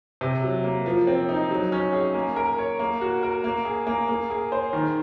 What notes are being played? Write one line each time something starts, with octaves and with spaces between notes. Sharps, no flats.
C3
F#3
A#3
F3
C4
D#4
F#3
C#4
G#4
A#3
A#4
C#5
A#3
F#4
A#4
A#3
G#4
A#3
A#3
G#4
C5
D#3